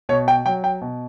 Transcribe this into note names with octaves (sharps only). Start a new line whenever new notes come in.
B2 C#5
G5
F#3 G5
G5
B2